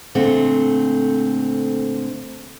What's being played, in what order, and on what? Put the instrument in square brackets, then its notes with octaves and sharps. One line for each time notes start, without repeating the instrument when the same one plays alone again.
[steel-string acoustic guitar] A#2 D3 A3 C4